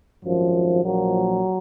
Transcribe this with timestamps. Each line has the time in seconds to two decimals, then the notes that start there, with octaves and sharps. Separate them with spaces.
0.24 G#1 F#2 F3
0.82 A#1 A#2 F3 F#3